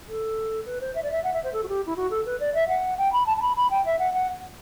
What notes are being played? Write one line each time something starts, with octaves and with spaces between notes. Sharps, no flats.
A4
B4
C5
E5
D5
E5
F#5
E5
C5
A4
F#4
G4
E4
F#4
A4
B4
D5
E5
F#5
G5
B5
A5
A5
B5
B5
G5
E5
F#5
F#5